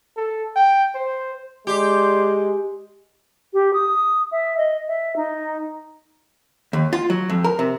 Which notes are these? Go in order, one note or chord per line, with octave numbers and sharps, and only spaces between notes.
A4
G5
C5
G#3 G4 D5 C6
G4
D#6
E5
D#5
E5
D#4
D#2
F4
F#3
F2
A#4
C3